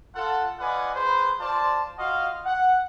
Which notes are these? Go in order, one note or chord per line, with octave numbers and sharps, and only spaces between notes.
F4 A4 F#5
F4 B4 D5 D#5 F#5 G#5
G#4 B4 C5
F4 C5 D5 A5
F4 F#4 D#5 F5
F#5